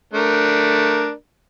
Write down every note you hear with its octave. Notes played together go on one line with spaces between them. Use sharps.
A3 D4 A#4